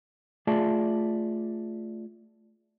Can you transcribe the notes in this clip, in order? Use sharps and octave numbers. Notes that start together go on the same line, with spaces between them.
A3 F4 G#4 D5 E5 A5